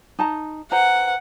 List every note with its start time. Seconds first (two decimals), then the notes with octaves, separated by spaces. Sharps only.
0.19 D#4 A5 A#5
0.72 B4 C5 F#5 A#5